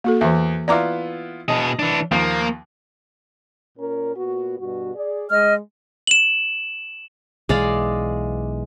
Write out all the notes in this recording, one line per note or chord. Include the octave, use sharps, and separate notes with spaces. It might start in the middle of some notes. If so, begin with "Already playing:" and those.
A#3 F#4 A4
E2 E3 E5
B3 E4 F4 D5 A#5 D6
B2 G#4 D#5 A5
E3 D4
D#2 F3 A#3
A#2 C#4 A#4
A#2 B3 F#4
G2 B2 F#4
G#4 D5
G#3 D#5 F6
E7 F#7
B1 E3 G#3 D5 F5